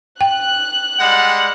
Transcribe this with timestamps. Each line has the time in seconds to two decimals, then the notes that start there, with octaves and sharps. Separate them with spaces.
0.21 G5 F#6
0.99 G3 G#3 F#5